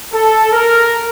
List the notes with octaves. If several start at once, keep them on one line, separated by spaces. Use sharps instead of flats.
A4
A#4